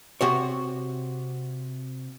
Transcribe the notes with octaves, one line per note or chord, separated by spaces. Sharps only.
C3 F#4 C#5